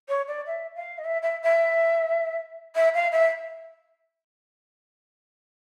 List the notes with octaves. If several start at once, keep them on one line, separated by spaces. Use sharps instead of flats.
C#5
D5
E5
F5
D#5
E5
E5
E5
E5
F5
E5